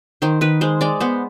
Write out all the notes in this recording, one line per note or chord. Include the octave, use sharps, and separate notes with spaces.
D#3 C5
D#3 B4
G#3 C5
G#3 D5
B3 C5